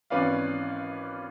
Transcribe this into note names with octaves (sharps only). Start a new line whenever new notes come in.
G#1 E3 C#4 B4 D5 F5